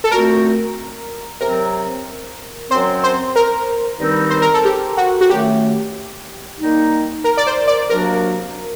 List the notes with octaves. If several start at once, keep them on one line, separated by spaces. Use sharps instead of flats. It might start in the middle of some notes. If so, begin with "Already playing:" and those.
A4
A#2 A3 C4 F#4 A#4
C3 F#3 C4 A#4
F#2 F#3 C4 C5
C5
A#4
G2 D#3 G3 C4 D#4
C5
A#4
A4
G4
F#4
F#4
F#2 D#3 A3 G4
D#3 G3 A#3 D#4
A#4
D5
C5
D5
C3 F#3 A#3 D4 F#4 A#4